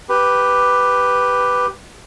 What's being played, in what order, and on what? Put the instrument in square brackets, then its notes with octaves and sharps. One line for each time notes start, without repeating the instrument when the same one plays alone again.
[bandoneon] G4 B4